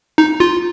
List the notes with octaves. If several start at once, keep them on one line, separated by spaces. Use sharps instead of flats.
D#4
F4